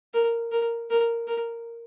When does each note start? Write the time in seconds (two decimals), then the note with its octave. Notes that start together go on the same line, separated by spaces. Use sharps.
0.14 A#4
0.52 A#4
0.90 A#4
1.27 A#4